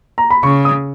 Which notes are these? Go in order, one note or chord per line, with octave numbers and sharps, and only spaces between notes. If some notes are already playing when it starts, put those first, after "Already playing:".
A#5
B5
C#3 C#6
D#6